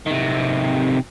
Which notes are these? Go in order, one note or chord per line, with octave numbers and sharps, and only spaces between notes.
C3 D#3